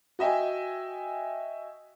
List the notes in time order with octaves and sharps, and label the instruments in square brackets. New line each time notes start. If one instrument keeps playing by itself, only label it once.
[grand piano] F#4 D#5 E5 G5 G#5